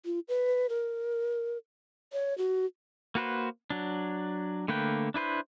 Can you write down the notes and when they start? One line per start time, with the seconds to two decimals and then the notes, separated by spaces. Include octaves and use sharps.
0.06 F4
0.28 B4
0.69 A#4
2.13 C#5
2.38 F#4
3.15 A#3 F#4 B4 C5
3.70 F#3 D4
4.68 D3 A3 A#3 B4 G5
5.14 D4 E4 B4 C5